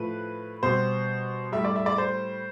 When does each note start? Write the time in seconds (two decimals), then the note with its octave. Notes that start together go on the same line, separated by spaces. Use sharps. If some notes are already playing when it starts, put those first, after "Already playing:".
Already playing: A2 F3 B4
0.63 B2 G3 C5
1.52 A2 G3 E5
1.65 D5
1.76 E5
1.86 D5
1.98 C5